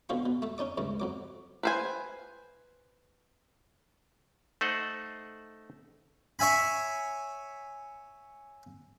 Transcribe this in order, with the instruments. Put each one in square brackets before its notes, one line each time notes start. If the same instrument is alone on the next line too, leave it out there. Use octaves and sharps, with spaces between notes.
[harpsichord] B2 D3 C4 F4 F5 C#6
B2
A3 A4
C#4 D#4 D5 D6
C#2 G2 A3
F2 F#3 D6
[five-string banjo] B4 C5 G#5
[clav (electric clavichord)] A3 D#4 C5 F#5
[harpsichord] C#5 E5 G#5 B5